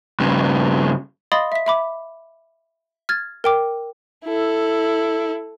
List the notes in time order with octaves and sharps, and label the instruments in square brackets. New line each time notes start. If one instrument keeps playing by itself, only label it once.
[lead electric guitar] G2 C#3
[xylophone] D#5 F5 B5 C6 D#6 A6
E5 B6
E5 B5 D6
F6 G#6 A6
A#4 G5 D6
[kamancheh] E4 A4